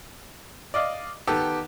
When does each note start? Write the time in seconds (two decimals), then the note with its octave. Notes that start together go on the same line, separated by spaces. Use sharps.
0.74 D5 D#5 F5
1.27 D#3 B3 G4 A4